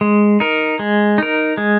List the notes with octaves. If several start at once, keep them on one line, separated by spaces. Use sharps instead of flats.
G#3
D#4 A#4
G#3
D#4 A#4
G#3